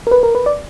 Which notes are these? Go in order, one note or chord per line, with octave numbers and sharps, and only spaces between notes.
A#4
B4
A#4
B4
D5